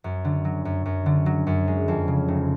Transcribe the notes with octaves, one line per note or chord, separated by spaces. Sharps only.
F#2
D3
F#3
F#2
F#2
D3
F#3
F#2
G#3
F2
C#3
F1